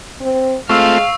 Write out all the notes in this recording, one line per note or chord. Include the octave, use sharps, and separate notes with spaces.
C4
G#3 A3 C4 F4 F5 C#6 E6